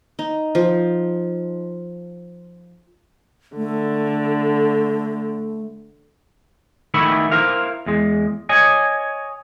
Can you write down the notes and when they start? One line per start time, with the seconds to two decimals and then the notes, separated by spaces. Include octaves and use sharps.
0.19 D#4
0.55 F3
3.57 D3 A3
6.94 D#3 A3 B3 E5 B5
7.32 E4 A#4 C5 F5
7.86 E2 G#3
8.49 C#5 D#5 G#5